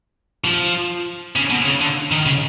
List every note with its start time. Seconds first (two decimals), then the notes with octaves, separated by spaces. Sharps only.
0.45 F3
1.36 C#3
1.50 B2
1.66 C#3
1.81 D3
2.12 D#3
2.26 C#3